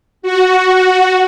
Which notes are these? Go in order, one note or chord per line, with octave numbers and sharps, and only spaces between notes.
F#4